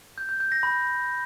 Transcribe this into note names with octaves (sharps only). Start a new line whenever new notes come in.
G6
G6
G6
A#6
B5